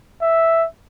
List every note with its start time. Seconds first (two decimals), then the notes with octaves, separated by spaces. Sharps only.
0.22 E5